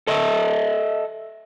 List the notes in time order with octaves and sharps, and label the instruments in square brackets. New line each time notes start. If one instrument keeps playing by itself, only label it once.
[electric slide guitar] A4 D#5 E5